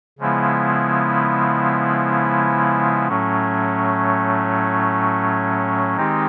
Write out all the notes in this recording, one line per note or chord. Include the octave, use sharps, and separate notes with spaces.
C#3 F3 G#3 B3 E4
A2 F#3 A3 C#4
D#3 G#3 C4 D#4 G4